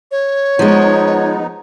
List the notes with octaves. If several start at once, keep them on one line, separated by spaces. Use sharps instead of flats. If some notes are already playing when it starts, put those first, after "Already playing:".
C#5
F3 G#3 B3 D#4